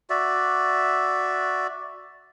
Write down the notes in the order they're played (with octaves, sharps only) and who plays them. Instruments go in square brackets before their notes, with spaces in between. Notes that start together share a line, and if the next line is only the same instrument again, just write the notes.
[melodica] F#4 D5 E5